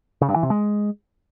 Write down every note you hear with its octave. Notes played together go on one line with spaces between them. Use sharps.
C#3
G2
E3
C3
G#3